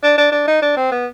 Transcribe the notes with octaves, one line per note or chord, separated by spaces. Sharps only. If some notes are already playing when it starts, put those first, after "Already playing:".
D4
D4
D4
D#4
D4
C4
B3